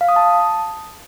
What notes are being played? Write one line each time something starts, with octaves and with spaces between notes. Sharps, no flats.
F5
D#6
A5